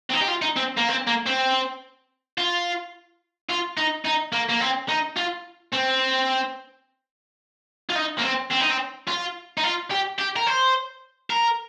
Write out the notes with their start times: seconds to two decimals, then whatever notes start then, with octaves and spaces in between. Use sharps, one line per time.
0.10 C4
0.14 D#4
0.21 G4
0.28 F4
0.42 D#4
0.56 C4
0.77 A#3
0.89 C4
1.07 A#3
1.26 C4
2.38 F4
3.49 F4
3.77 D#4
4.05 D#4
4.33 A#3
4.50 A#3
4.61 C4
4.89 D#4
5.16 F4
5.73 C4
7.90 F4
7.96 D#4
8.19 A#3
8.23 C4
8.51 C4
8.61 D#4
8.71 C4
9.08 F4
9.58 D#4
9.64 F4
9.91 G4
10.19 G4
10.36 A#4
10.47 C5
11.30 A#4